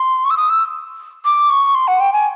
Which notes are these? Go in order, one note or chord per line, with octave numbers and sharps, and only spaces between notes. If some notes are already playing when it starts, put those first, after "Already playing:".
Already playing: C6
C#6
E6
D#6
E6
D6
C#6
C6
F#5
G5
G#5